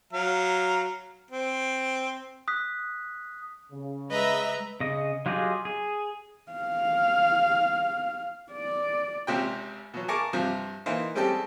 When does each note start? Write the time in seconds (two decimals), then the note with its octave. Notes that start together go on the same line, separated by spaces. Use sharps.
0.13 F#3 F5 A#5
1.30 C4
2.48 D#6 F#6 B6
3.72 C#3
4.10 G#3 B4 D#5 E5 A#5
4.80 C#3 D#5
5.26 F#3 F4 G4 G#4 D#5
5.65 G#4
6.52 F5
8.52 D5
9.27 G#1 C#2 C3 C5 G5
9.94 B2 F#3
10.08 G#4 A#4 A5 C#6 D6
10.33 G2 C3 F3
10.86 E3 A#3 D#4 C5
11.15 G3 G#3 C4 C#4 G4 A4